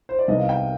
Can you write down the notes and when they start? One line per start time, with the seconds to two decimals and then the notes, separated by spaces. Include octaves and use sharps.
0.09 C5
0.19 D5
0.28 C2 C3 D#3 G3 B3 D#5
0.39 F5
0.49 G5